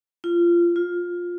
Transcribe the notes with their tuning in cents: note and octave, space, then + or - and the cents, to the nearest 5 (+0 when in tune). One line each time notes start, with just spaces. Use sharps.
F4 -20
F4 +10